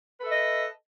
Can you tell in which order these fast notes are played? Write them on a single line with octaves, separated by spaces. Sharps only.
B4 A4 E5 D#5